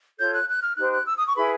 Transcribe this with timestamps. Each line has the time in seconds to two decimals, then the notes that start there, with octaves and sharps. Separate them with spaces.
0.18 F4 A4 C#5 G6
0.34 F#6
0.48 F#6
0.62 F6
0.76 D#4 G4 C5 F#6
0.92 F#6
1.06 E6
1.16 D#6
1.27 C#6
1.36 E4 G#4 B4 B5